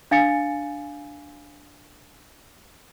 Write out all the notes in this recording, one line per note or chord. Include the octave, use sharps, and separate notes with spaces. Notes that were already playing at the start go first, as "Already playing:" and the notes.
D4 F5 G#5 A6 C#7